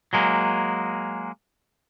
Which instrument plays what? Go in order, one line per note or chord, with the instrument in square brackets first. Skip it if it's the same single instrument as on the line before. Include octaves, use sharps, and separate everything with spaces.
[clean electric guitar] F#3 G#3 A#3